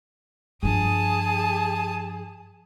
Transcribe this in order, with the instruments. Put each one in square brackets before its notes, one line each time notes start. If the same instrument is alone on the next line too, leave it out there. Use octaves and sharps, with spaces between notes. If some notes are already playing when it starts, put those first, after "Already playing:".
[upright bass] G2 F3 [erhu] G#4 [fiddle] A5 D#6